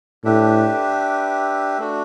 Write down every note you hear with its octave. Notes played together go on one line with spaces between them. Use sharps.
A2 D4 G4 B4 E5
A3 D4 F#4